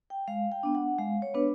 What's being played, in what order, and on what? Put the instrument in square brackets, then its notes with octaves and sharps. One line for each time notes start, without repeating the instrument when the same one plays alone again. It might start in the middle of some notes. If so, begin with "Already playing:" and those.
[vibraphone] G5
G#3 F5
G5
B3 D4
F#5
G#3 F5
C#5
B3 D4 B4